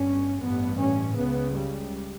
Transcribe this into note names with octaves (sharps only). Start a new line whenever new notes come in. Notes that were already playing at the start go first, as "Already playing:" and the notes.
Already playing: G1 G2 C#4
A1 G2 B3
C#4
C#2 C#3 B3
G3